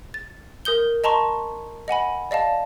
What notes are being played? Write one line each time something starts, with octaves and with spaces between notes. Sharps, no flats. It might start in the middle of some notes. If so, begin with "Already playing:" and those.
A6
A#4 D#6 G6 G7
D#5 A5 A#5 C6 C#6
D#5 F#5 G#5 B5
D5 D#5 F5 A5